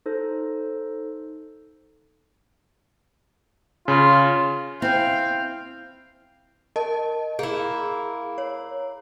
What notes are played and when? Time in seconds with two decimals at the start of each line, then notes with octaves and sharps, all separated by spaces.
0.06 D#4 A4 C5
3.88 C#3 F4
4.82 C4 E4 F5 G5 G#5
6.76 A#4 D#5 A5
7.39 A#3 E4 G#4
8.38 C#5